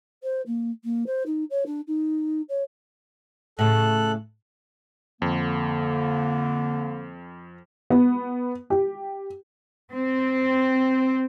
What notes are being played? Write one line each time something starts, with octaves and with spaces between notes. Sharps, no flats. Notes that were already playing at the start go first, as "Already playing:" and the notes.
C5
A#3
A#3
C5
D#4
C#5
D4
D#4
C#5
A2 C#3 A4 F#6
F2 D3 A#3
B3
G4
C4